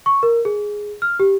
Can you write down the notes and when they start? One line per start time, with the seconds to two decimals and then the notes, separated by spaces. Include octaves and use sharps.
0.06 C#6
0.23 A#4
0.45 G#4
1.02 F6
1.20 G4